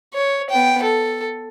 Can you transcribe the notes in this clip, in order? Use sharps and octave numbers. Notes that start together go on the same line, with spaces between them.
C#5
B3 G5
A4